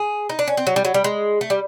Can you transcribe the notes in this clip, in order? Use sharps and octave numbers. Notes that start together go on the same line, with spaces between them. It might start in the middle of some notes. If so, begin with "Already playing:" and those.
Already playing: G#4
D#4
D4
C#4
C4
F#3
G3
F#3
G3
G#3
A3
G3